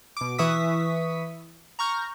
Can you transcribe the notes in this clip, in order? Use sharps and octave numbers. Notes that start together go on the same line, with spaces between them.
B2 D6
E3 B4 E5 C#6 D#6 B6
A#5 C#6 F6 G6